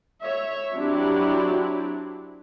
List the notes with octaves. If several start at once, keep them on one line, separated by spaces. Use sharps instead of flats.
C#5 E5
F#3 C4 D4 E4 F#4 G4